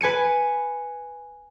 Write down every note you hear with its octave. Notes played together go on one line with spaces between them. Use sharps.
B4 G#5 C#7 D#7